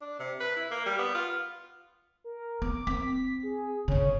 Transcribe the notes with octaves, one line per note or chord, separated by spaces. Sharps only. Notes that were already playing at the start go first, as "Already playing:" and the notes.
D4
C3
B4
E4
A#3
G3
B3
F4
A#4
B3 D6
C4 B6
G#4
G1 C#3 C#5